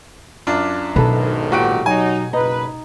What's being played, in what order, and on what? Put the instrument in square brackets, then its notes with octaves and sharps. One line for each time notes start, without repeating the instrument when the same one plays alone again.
[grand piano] F#2 D4 F4
[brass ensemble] B1 G#2 D#3 [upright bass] B2 [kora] A4 B4
[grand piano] A#2 F#5 D7 [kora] F#4 G4
[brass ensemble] F#3 D#4 [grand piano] G#5
[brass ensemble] F#1 B4 [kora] D#4